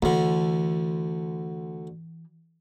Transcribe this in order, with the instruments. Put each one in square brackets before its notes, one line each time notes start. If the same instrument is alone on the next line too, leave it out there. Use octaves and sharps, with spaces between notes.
[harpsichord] D2 D3 [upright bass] E3